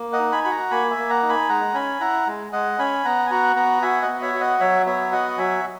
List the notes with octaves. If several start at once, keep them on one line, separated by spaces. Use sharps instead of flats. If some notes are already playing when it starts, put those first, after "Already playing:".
Already playing: A#3
D#5 F#5
D#4
G#5 B5
F#4 B5
F#5 A#5
A#3 G#5 B5
E5 G#5
A#3
F#5 A#5
D#4
G#5 B5
G#3 F#5 A#5
C#4 G#5 B5
E4 F#5 A#5
G#3
G#3 D#5 F#5
C#4 G#5 B5
B3 F#5 A#5
G#5
F#4 F#5 A#5
B3 F#5 A#5
F#4 E5 G#5
D#5 F#5
B3
C#5 E5
F#4
D#5 F#5
F#3 C#5 E5
B3 C#5 E5
F#4 D#5 F#5
F#3 E5 G#5